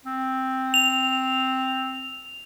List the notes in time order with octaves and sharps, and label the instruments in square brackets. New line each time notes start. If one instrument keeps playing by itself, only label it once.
[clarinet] C4
[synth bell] F7